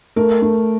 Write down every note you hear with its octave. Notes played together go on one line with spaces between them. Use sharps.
A3 A#4
A3